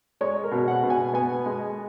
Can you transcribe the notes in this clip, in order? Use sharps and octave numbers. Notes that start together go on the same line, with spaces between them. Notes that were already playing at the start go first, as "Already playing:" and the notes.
G#3 C#5
A#4
B2
F#5
B2
G#5
B3 G#5
G#3